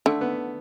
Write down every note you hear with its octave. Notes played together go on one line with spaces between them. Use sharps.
D3 A3
B3